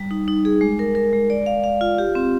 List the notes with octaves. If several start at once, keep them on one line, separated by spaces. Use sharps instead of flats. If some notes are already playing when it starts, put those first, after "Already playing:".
Already playing: G3
D#4
D#4
G#4
G#3
A#4
A#4
G#3
D5
F5
F5
F4
G4
C4